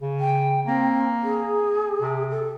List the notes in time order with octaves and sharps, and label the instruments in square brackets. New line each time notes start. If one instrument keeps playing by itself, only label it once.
[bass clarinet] C#3
[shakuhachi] G5
[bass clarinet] A#3 [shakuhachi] C4
[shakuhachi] G#4
[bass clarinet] C3
[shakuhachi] A4